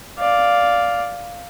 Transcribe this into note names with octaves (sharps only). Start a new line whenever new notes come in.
D5 F5